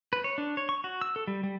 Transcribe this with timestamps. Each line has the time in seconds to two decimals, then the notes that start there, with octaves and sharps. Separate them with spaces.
0.13 B4
0.24 C#5
0.38 D4
0.57 C#5
0.69 C#6
0.84 F#4
1.01 E6
1.16 A4
1.28 G3
1.43 G3